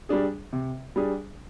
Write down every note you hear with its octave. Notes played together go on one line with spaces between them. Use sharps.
G3 D4 G#4
C3
G3 D4 G#4